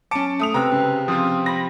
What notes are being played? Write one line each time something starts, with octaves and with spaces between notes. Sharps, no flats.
F#3 C#4 A5 D6 C#7 D7
A3 D#6 F7
C3 B4 A#5 E6
C#3
F3 C4 F4 D#6
B5 A#6